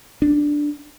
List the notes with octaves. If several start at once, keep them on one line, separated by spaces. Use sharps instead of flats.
D4